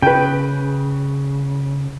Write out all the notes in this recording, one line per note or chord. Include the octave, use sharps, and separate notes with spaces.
C#3 B4 G5